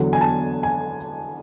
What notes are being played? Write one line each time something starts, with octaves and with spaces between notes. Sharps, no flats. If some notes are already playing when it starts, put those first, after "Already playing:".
Already playing: E2 D3 F#3 F#5
G#5
A5
G#5